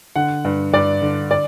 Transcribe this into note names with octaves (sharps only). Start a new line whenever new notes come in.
D3 F#5
G2
G2 D5
D3
D5